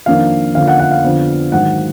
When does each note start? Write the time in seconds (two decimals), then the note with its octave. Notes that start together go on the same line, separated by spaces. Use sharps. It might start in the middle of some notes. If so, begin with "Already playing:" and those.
0.06 F2 D#3 A#3 D4 F5
0.55 F2 D3 F3 A#3 F5
0.68 F#5
0.80 F#5
0.91 F5
1.04 F2 D3 F3 B3 D4
1.52 G#2 D#3 F#3 F#5